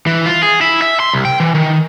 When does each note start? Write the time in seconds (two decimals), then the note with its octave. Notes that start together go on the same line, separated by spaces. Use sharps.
0.06 E3
0.26 F4
0.43 G#4
0.61 E4
0.82 E5
1.00 C6
1.13 C2
1.25 G5
1.40 E3
1.55 D#3